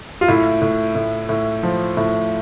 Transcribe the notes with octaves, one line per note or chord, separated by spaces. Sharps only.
F4
A2 E4
A2
A2
A2
F3
A2